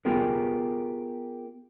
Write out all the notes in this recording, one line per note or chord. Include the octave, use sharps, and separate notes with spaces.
B3 F4 G4 G#4 A#4